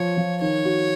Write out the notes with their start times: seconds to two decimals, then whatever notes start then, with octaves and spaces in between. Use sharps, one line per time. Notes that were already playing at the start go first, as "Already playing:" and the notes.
Already playing: F3 C#5
0.17 F3
0.41 D#3 C#5
0.65 F#4